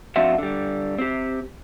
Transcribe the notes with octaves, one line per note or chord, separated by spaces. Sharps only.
F3 C4 D4 F4 F#4 E5
D3 G3
C4 G4